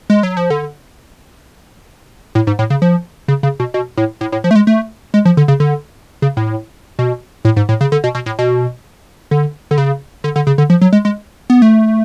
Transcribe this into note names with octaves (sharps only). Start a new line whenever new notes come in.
G#3
F#3
F3
D3
A2
G#2
A2
C#3
F3
C#3
C#3
B2
B2
A2
A2
A2
F3
A3
G#3
A3
G#3
F3
D3
C#3
D3
C#3
A2
B2
A2
G#2
A2
C#3
D3
B2
B2
A2
B2
D3
D3
C#3
D3
D3
C#3
D3
F3
F#3
G#3
G#3
B3
A3